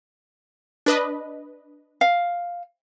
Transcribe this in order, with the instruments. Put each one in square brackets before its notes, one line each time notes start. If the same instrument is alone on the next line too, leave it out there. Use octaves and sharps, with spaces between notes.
[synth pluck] D4 B4 D#5
[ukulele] F5